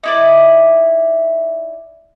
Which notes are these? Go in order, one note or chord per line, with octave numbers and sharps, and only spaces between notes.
D#4 E4 D5